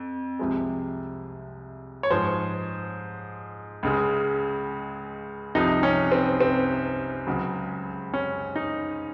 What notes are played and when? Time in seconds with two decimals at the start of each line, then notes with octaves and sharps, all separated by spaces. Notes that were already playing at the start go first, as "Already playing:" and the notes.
Already playing: F2
0.39 C2 C3 F3 G#3
2.03 C#5
2.11 G#2 F3 G#3 C5
3.83 C#2 C#3 G#3
5.55 C2 C3 F3 D#4
5.83 C#4
6.12 C4
6.41 C4
7.27 C#2 C#3 F#3
8.14 C#4
8.56 D#4